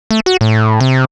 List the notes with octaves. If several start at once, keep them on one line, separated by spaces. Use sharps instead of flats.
A3
F#4
A2
C3